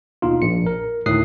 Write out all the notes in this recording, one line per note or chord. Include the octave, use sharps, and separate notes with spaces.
D#2 B2 D#4 F4
A#1 C#7
A#4
D2 A2 D#3 D#6 F#6 C7